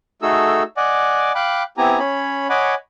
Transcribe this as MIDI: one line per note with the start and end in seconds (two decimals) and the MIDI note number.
0.22 0.63 57
0.22 0.63 63
0.22 0.63 66
0.22 0.63 68
0.22 0.63 69
0.22 0.63 88
0.77 1.32 74
0.77 1.32 75
0.77 1.32 78
0.77 1.32 80
0.77 1.32 86
1.35 1.63 77
1.35 1.63 79
1.35 1.63 83
1.35 1.63 86
1.35 1.63 90
1.78 1.99 59
1.78 1.99 60
1.78 1.99 64
1.78 1.99 67
1.78 1.99 80
1.78 1.99 82
1.99 2.47 61
1.99 2.47 73
1.99 2.47 83
2.50 2.75 73
2.50 2.75 75
2.50 2.75 78
2.50 2.75 80
2.50 2.75 83
2.50 2.75 86